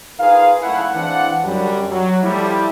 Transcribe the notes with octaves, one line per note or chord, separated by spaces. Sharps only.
D#4 F4 G#4 A#4 B4 F5
F#1 C#2 A3 E4 F5 F#5
E3 G#3 C4 D4 F5 F#5
F#2 D3 F#3 G3
F#3
F3 G3 A3 E4